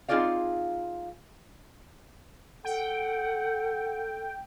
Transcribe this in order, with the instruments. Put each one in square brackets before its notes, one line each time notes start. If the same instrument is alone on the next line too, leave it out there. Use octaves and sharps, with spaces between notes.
[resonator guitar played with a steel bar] C4 D#4 F4 G#4 D5 F5
[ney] A4 [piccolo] F#5 [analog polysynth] G5